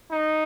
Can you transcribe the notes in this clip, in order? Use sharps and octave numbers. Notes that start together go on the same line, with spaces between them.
D#4